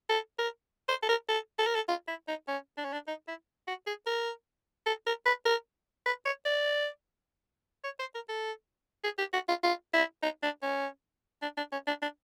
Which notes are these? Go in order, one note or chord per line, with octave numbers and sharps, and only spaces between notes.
A4
A#4
C5
A4
A#4
A4
A4
A#4
A4
F4
E4
D#4
C#4
D4
C#4
D4
D#4
E4
F#4
G#4
A#4
A4
A#4
B4
A#4
B4
C#5
D5
C#5
C5
A#4
A4
G#4
G4
F#4
F4
F4
E4
D#4
D4
C#4
D4
D4
C#4
D4
D4